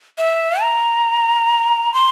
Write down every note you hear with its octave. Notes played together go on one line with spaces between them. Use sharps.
E5
A#5
C6